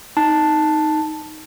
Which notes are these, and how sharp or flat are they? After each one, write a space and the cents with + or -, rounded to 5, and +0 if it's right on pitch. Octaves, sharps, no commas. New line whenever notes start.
D#4 +0 A5 +0